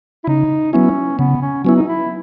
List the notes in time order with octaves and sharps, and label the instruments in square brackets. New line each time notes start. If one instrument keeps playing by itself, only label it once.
[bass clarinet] E4
[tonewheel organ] C#3 [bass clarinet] D#4
[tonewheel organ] F#3 B3 E4 [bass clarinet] C#4
[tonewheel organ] C#3 [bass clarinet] B3
[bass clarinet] C#4
[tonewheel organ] F#3 B3 E4 [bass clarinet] C#4
[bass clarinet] D#4
E4